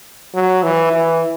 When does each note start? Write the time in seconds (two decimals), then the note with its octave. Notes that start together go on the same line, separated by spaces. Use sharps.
0.35 F#3
0.63 E3
0.93 E3